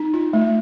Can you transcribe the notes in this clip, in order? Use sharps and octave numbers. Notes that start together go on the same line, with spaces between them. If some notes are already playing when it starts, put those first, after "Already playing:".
Already playing: D#4
F4
A3